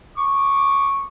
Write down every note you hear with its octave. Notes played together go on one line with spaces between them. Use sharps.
C#6 D6